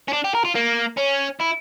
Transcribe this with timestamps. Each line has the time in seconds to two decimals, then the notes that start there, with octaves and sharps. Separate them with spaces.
0.08 C#4
0.13 D4
0.24 G4
0.35 A#4
0.45 F4
0.55 A#3
0.98 C#4
1.41 E4